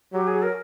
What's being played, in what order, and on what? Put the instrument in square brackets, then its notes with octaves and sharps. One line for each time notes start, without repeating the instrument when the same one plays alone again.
[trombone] F#3 [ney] G4
[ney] G#4
A#4